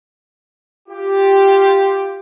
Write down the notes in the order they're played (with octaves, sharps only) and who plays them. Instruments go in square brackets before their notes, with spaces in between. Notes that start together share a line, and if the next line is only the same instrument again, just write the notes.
[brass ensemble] F4 G4